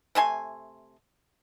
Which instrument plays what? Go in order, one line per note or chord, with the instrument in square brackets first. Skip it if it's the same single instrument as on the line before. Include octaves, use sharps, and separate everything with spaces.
[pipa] C3 A3 G#5 C6